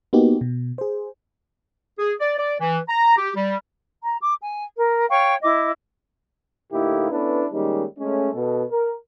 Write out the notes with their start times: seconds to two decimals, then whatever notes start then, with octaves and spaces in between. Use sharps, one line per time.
0.13 A#3 B3 D#4 F#4 G4
0.41 B2
0.78 G#4 C5
1.99 G#4
2.20 D5
2.39 D5
2.60 E3
2.89 A#5
3.17 G4
3.36 G3
4.04 A#5
4.21 D6
4.42 G#5
4.75 A#4
5.10 C#5 F5 G5 C#6
5.43 E4 D#5 D6
6.72 A2 D3 A#3 D#4 E4 G4
7.11 B3 C#4 D4 E4 A4 B4
7.52 D#3 G3 G#3 A#3 C#4 D#4
7.99 G#3 A3 C#4
8.34 B2 A4
8.71 A#4